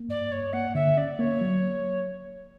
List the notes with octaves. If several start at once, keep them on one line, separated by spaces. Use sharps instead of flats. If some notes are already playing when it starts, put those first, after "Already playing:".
Already playing: A#3
G2 D5
G2 C#5
A#3 F#5
D3 E5
C#4 D5
A#3 C#5
F#3